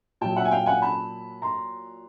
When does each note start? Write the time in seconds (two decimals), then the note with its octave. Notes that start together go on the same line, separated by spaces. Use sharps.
0.21 A#2 F#3 G5 A5
0.37 E5 F#5
0.45 G#5
0.51 F5 G5
0.66 F#5 G#5
0.82 A5 B5
1.42 A#5 C6